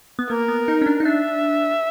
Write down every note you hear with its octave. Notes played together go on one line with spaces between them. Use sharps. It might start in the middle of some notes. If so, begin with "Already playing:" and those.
B3
A#3 A#4
B3
D#4
C#4
D4
D#4
D4 E5